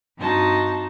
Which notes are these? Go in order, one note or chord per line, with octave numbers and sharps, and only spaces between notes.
G2 C4 D#4 F#4 D#5 A5